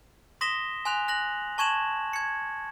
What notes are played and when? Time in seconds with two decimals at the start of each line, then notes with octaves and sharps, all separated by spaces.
0.41 C6 D#6 A#6 B6 E7 G7
0.85 G#5 C6 F#6 F7
1.08 F#6 A#6 F#7
1.58 A5 C#6 G#6 E7 F#7
2.13 G#6 C#7